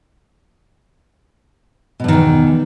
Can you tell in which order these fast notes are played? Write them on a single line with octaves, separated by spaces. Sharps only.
B2 G2 D#3 E2